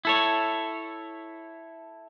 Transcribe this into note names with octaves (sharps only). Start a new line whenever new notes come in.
E4 A4 C#5